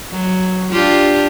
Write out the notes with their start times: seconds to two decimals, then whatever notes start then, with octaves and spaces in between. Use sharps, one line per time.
0.11 F#3
0.71 D4 F4 G4